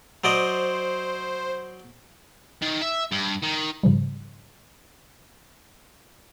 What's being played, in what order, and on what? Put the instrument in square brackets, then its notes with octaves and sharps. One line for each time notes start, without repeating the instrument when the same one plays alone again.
[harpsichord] F#3 D5 D#5 [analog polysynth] C5
[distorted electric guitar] D#3
E5
G2
D#3
[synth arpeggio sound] G#2 C#3 F3 G3